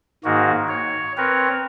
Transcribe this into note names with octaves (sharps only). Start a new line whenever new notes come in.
G#2 D#3 A#3 F#4
C#5
C4 A#4 B4 C#5